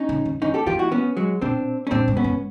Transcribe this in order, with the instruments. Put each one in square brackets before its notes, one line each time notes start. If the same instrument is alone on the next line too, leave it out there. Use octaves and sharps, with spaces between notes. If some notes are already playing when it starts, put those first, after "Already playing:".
Already playing: [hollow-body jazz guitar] C#4 D#4
[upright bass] C#3
D3
[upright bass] D#3 [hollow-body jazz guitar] C#4 D#4
[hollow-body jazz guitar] G4 A4
[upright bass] E3 [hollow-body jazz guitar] F4 G4
[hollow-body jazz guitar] E4 F#4
B3 C#4
F#3 G#3
[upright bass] B2 [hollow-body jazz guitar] C4 D4
[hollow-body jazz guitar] C#4
[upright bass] A2 [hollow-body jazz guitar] C4 D4
[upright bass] G#2
[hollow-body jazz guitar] B3 C#4
[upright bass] G#2